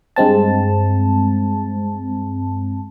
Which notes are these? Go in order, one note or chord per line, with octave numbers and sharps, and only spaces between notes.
G2 G#3 C4 A5